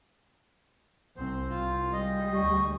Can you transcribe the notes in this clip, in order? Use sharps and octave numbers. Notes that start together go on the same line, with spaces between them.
C2 C4 C5
C2 F4
G3 G#3 D#5
D2 D3 C#6